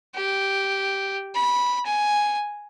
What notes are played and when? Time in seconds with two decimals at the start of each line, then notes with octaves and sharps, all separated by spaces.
0.16 G4
1.35 B5
1.86 G#5